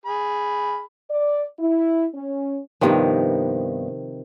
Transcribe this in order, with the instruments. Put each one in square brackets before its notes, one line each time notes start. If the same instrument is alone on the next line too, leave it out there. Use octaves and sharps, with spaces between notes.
[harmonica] G#4 B5
[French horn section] D5
E4
C#4
[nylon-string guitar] G2 B3 D#4 [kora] C3 D#3 F3